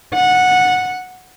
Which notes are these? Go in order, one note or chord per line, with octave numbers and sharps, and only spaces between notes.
F#5